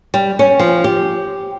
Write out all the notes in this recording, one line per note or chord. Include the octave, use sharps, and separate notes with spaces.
G3
C#4
F3
G4